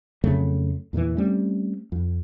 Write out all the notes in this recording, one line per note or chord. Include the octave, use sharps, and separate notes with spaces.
F2 C#3 F#3 A3
E2 A#2 D#3 E3
G3 A3 C4 C#4
F2